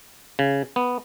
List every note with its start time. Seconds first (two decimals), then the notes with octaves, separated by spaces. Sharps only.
0.39 C#3
0.76 B3